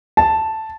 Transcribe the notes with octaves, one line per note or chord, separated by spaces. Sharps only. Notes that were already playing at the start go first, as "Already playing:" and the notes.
A5